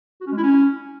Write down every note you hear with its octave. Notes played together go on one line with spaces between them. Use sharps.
F#4
C#4
G#3
E4
C#4